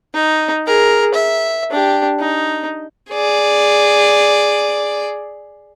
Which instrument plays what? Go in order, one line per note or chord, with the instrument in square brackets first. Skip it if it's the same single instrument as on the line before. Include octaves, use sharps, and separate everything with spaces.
[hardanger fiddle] D#4
G#4 A#4
E5
D4 G4
D#4
G#4 D5